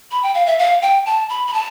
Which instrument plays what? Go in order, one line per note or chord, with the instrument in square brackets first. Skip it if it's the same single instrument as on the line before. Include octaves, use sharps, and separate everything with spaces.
[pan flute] B5
G5
F5
E5
F5
G5
A5
B5
B5
A5